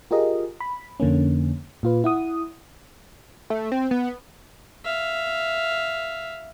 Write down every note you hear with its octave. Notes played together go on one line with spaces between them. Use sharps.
F4 G4 G#4 A#4 D#5
B5
F2 D3 A#3 C#4
A#2 F4 B4
E4 F#5 D#6
A3
C4
B3
E5 F5